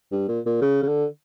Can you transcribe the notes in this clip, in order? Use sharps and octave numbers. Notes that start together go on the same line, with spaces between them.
G2
A#2
A#2
C#3
C#3
D3